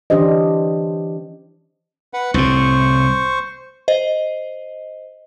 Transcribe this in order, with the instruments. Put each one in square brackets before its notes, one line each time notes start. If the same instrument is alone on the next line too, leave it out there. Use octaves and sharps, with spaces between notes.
[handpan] E3 C#4 D4 G4 C5 D#5
[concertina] B4 F#5
[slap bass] C2 A2 [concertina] C5 C#6
[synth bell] C5 D#5